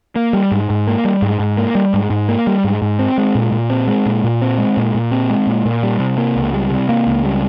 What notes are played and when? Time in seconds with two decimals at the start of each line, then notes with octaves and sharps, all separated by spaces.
0.16 A#3
0.33 G3
0.51 G#2
0.70 G#2
0.87 A#3
1.05 G3
1.22 G#2
1.39 G#2
1.57 A#3
1.75 G3
1.94 G#2
2.10 G#2
2.29 A#3
2.47 G3
2.64 G#2
2.82 G#2
2.99 C4
3.18 G#3
3.35 A#2
3.52 A#2
3.70 C4
3.87 G#3
4.06 A#2
4.24 A#2
4.42 C4
4.58 G#3
4.77 A#2
4.95 A#2
5.11 C4
5.30 G#3
5.47 A#2
5.65 A#2
5.83 G3
6.00 C3
6.17 A#3
6.36 C#2
6.53 G3
6.70 C3
6.89 A#3
7.07 C#2
7.25 G3